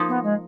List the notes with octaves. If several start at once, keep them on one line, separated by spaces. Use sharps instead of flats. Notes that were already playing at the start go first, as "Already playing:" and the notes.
Already playing: F3 A#3 D#4
B3
G#3